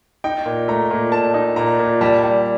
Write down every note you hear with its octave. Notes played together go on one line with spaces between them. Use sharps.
D#4 G5
A#2
A3 A#5
A#2
A#2 A5
D#4
A#2 A#5
A#2
G3 A5
G3